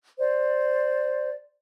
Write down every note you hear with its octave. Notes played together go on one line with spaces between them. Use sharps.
C5 D5